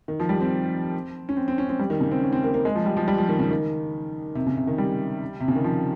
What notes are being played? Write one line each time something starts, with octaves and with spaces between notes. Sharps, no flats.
D#3
F3
G3
C4
C#4
C4
C4
C#4
C4
G3
D#3
C#3
C4
C#4
C4
A#3
A#3
G#3
F3
G3
F3
G3
F3
D#3
C#3
D#3
C3
C#3
C3
D#3
G3
C3
C#3
D#3
F3